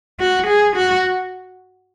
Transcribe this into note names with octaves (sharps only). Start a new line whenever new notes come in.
F#4
G#4
F#4